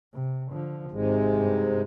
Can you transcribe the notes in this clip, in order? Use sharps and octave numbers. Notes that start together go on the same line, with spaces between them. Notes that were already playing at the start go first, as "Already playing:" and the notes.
C3
D3 F3
G#1 G#2 C3 G#3
G2